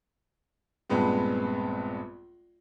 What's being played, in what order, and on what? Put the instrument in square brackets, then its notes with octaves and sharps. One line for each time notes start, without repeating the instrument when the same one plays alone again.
[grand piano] A#1 G2 G#3 B3 C4